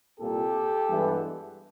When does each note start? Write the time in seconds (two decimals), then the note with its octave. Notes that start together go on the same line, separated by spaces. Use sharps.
0.20 C2 A#2 G3 A#3 G4 A4
0.89 G2 E3 G#3 B3